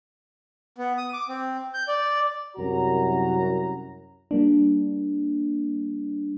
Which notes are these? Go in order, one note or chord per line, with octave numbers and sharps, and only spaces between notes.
B3
D#6
D6
C4
G6
D5
C2 F#2 F#4 A#5
G3 A#3 D4